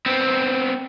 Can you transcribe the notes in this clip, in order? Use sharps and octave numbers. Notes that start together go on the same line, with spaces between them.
B3 C4